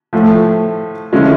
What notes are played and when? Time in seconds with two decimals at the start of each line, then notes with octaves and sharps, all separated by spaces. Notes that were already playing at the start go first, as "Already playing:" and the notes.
0.13 A2 F3 A3
1.12 D3 F3 G#3 C#4 E4